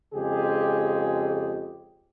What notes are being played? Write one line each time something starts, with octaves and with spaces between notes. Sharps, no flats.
F2 C#3 G#3 G4 G#4